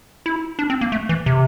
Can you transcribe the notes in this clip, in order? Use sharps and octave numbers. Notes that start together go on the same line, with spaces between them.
E4
D4
C4
A#3
A3
E3
C3